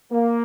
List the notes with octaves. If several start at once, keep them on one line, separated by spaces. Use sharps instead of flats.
A#3